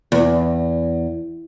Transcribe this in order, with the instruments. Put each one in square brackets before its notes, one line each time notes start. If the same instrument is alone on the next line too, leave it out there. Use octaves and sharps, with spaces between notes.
[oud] E2